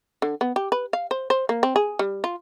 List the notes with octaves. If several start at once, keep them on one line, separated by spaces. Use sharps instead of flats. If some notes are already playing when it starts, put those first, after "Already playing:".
D3
B3
G4
B4
F5
C5
C5
A#3
C4
G#4
G3
F4